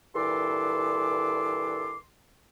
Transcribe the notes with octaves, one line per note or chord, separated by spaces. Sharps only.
G2 A#2 E3 A4 C6 D6